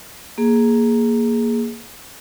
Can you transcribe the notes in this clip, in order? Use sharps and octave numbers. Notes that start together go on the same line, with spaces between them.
A#3 G#4